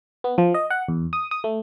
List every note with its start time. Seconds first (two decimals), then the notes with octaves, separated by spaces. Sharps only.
0.24 B3
0.38 F3
0.54 D#5
0.70 F#5
0.88 E2
1.13 D#6
1.31 D#6
1.44 A3